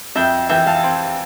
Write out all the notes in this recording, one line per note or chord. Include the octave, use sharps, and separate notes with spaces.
F2 E5 G5
E3 E5 G5
F5 A5
C4